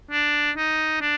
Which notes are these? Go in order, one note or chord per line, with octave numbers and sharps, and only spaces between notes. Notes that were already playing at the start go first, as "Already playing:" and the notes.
D4
D#4
D4